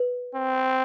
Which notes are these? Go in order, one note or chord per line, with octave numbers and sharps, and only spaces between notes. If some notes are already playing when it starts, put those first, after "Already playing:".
Already playing: B4
C4